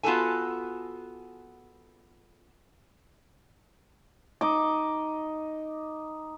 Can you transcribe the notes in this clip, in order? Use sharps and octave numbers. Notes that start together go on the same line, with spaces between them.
B3 F4 F#4 G#4 A4 G#5
D#4 D#5 D6